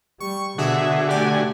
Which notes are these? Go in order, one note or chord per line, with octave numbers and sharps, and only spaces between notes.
G3 C#6
B2 D3 F#4 G#4 E5
A3 G4 D5 G#5